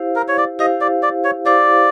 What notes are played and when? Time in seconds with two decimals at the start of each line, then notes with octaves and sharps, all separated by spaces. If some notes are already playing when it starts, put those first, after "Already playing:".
Already playing: E4 G4 C5 F5
0.16 A#4
0.28 C#5
0.38 D5
0.59 E4 G4 C5 D#5 F5
0.81 D5
1.03 D5
1.24 C#5
1.46 E4 G4 C5 D5 F5